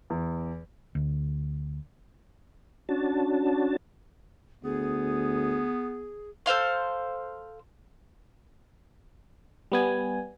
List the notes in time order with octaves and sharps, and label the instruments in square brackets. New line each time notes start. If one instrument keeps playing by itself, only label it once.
[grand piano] E2
[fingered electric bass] D2
[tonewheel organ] C#4 D4 F#4 A5
[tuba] D2 [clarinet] B3 [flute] G#4
[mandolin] A4 C5 F5 C6
[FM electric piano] G3 B3 G#5